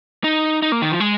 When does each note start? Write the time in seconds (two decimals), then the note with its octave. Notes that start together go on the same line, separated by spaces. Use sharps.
0.24 D#4
0.62 D#4
0.72 A#3
0.82 D#3
0.91 F3
1.00 G#3